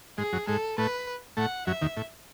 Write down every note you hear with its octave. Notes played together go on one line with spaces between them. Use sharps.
G#2 G#3 G#4
F#2 F#3
G#2 G#3 A4
A2 A3 B4
A2 A3 F#5
F#2 F#3 E5
D#2 D#3
A2